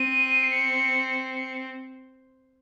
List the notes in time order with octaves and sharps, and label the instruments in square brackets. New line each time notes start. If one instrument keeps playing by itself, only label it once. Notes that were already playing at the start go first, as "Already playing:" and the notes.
Already playing: [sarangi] C4 [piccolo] D#7
[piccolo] C7
C#7
C#7